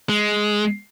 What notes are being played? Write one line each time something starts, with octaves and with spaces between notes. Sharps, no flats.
G#3